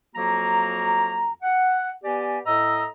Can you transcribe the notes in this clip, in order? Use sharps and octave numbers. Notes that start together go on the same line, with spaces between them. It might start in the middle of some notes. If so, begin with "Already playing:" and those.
F2 F#3 A#3 F#4 A#5
F#5
B3 G4 D5 G#5
A2 D#5 A#5 E6